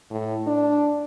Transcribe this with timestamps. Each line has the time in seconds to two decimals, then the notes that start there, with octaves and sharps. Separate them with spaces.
0.11 A2
0.47 D4